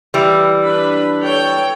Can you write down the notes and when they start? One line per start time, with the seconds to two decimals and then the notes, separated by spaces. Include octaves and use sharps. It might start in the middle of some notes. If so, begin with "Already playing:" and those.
0.14 E3 G3
0.63 D4 B4 B5
1.21 A4 C#5 G5